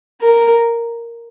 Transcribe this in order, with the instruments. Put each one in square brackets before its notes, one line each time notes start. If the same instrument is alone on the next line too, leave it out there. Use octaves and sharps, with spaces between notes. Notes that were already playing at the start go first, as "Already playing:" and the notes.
[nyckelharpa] A#4